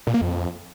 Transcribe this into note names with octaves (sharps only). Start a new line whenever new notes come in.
A#2
A#3
F2